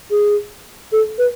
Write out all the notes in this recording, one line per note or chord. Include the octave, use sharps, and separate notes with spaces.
G#4
A4
B4